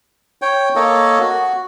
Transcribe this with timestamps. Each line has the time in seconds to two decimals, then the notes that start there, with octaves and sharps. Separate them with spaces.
0.42 C#5 G5
0.76 A#3 A4 C#5 D#5
1.20 F#4